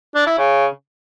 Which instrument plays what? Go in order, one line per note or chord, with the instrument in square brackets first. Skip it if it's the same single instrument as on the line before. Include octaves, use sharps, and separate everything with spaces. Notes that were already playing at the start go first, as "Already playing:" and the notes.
[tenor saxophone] D4
E4
C#3